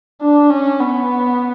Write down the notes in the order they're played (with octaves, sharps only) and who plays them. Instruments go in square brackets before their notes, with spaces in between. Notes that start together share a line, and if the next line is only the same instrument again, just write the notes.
[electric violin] D4
C#4
B3